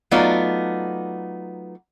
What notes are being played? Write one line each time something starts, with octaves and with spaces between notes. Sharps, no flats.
F#3 A3 B3 D#4 F4 D5